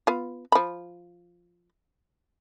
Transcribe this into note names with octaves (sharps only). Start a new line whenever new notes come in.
B3 F4
F3 B5